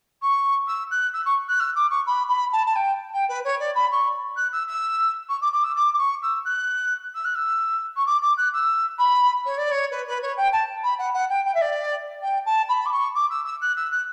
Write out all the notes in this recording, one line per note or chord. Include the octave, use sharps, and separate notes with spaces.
C#6
E6
F#6
E6
C#6
F#6
E6
D6
C#6
B5
B5
A5
A5
G5
G5
B4
C#5
D5
B5
C#6
F#6
E6
E6
C#6
D6
D6
E6
D6
D6
C#6
E6
F#6
E6
F#6
E6
C#6
D6
D6
F#6
E6
B5
C#5
D5
C#5
B4
B4
C#5
G5
A5
B5
F#5
F#5
G5
G5
E5
D5
G5
A5
B5
D6
C#6
D6
E6
E6
F#6
E6
F#6